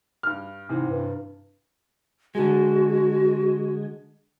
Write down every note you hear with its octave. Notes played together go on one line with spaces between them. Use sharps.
G2 F6
G#2 C3 E3 C4
G2
D3 G#3 F#4